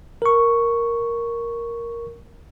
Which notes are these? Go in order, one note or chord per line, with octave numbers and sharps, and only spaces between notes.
A#4 C#6